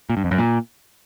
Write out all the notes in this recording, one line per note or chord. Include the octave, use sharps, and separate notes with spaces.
A#2
G2
F2
F#2
A#2